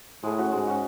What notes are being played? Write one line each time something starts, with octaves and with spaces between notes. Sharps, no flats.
A2 G#3
C#4 F#4
G#2 G#3
C#4 F#4